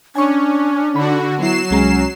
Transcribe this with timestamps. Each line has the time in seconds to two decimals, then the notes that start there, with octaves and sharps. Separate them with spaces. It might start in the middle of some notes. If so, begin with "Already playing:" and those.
0.15 C#4 D4 G#5 C#6
0.94 D3 D#4 F#4 B5
1.39 F#3 B3 E4 C7 E7
1.71 C2 G#3 C#4 A#5